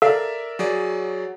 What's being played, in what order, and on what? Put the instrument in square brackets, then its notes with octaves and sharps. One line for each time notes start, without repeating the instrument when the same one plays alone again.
[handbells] A4 F5 [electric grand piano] A#4 D5 E5
[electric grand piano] F#3 G#4 D5